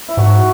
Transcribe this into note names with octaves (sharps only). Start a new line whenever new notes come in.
E4
G#2 F#4